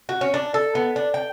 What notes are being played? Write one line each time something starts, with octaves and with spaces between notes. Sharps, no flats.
F#4
C#4
D4
A4
B3
D4
G5